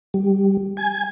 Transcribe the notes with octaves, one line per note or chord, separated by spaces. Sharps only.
G3
G#5